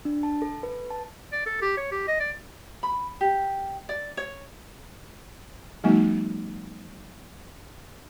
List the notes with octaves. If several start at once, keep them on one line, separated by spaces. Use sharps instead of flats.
D4
A5
A4
B4
A5
D5
A4
G4
C#5
G4
D#5
D5
B5
G4
D5
C#5
F3 G3 A3 B3 D#4 F#4